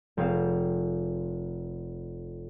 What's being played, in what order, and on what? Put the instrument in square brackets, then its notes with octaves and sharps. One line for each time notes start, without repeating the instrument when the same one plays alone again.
[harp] F1 C4 G#4 F5 E7